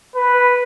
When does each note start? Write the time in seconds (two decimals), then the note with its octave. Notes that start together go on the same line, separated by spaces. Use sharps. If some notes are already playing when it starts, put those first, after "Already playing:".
0.15 B4